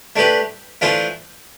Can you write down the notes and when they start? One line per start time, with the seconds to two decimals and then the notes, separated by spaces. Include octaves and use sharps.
0.16 A3 D4 G4 B4
0.81 E3 A3 D4 F4 C5